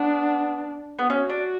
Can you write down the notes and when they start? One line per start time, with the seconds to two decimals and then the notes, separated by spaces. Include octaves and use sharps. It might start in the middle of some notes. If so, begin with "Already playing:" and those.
Already playing: B3 D4
0.99 B3
1.10 C#4 F#4
1.30 D4